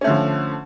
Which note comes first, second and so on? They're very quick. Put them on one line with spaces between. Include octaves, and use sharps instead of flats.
C#4 A3 D3 F3